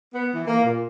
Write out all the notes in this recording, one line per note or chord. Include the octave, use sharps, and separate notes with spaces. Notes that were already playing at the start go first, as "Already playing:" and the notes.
B3
E3
A#3
A#2